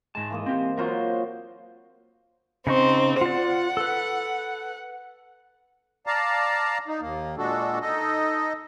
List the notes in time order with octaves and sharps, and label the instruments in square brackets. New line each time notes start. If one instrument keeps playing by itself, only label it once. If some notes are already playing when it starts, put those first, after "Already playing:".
[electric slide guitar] G#2 A5 [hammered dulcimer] G#3
[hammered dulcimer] E3 A#3 D#5
[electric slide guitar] C4 G4 [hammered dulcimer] C5
[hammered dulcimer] F#3 F4 F#4 [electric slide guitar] A#4 C5
[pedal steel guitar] C#3 D#4 C#6 [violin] C4
[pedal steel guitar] F4 D5 [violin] F#5
[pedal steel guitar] A4 B4
[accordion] D5 F5 A5 A#5
D#4
D#2 A#3
A#2 G#3 D4 F#4 A4
D#4 A4 D#5